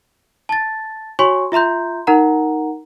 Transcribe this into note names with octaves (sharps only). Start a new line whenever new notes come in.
A5 A6
F#4 C#5 G#5 C6 C#6
F4 E5 A#5 C6 G6
D#4 A#4 F#5 A#5